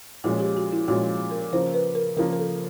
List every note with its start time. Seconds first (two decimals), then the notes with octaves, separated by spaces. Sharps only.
0.24 A#2 F3 G#3 C#4 F#4
0.40 G4
0.57 F#4
0.72 E4
0.88 A#2 F3 G#3 C#4 F#4
1.31 A#4
1.53 C#3 F3 A#3 C5
1.74 B4
1.95 A#4
2.17 C#3 F3 A#3 A#4
2.33 A#4
2.39 A4